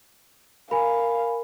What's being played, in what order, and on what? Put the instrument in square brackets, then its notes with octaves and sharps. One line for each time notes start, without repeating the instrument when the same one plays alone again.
[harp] A#4 [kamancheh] F5 [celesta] G#5 B5